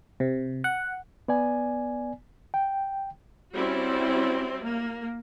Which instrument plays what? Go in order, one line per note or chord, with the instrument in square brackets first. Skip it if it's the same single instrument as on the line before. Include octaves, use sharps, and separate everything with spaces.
[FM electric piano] C3
F#5
[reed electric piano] B3 D5 G#5
G5
[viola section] G3 C4 C#4 E4 F#4 D5
A#3